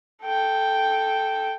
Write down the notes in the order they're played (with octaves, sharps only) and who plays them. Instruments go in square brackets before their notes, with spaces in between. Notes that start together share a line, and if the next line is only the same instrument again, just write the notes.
[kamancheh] A4 G5